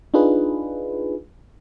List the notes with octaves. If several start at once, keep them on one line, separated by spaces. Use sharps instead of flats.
D4 D#4 F4 G#4 B4